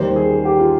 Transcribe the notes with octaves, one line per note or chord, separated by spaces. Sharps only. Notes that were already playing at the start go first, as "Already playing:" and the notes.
Already playing: D#2 D#3 G3 C5
G#4
G4
F4